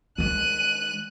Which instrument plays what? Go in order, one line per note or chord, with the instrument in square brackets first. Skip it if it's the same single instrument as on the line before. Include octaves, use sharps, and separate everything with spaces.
[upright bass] D#3 G#3 [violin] F#6 D#7